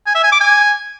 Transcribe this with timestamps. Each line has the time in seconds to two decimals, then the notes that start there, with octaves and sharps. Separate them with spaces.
0.06 G#5
0.15 E5
0.24 G#5
0.32 D6
0.41 G#5